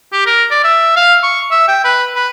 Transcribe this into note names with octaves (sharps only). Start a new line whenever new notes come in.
G4
A#4
D5
E5
F5
C#6
E5
G5
B4
B4